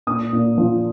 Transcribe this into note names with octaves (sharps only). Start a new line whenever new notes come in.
A#2 D#6
A#2
F3